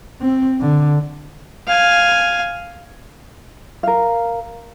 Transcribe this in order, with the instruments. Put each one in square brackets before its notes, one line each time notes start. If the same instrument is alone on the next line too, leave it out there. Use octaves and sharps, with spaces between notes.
[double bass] C4
D3
[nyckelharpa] F5 G#5
[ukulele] A#4 F5